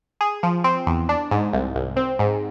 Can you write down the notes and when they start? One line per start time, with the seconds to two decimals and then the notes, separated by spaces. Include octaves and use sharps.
0.21 G#4
0.43 F3
0.64 C4
0.87 E2
1.09 D4
1.31 G#2
1.53 C2
1.75 C2
1.96 C4
2.19 G#2